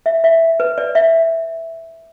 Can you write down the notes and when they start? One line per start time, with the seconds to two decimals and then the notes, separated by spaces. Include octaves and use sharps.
0.06 E5
0.24 E5
0.60 B4
0.78 D5
0.95 E5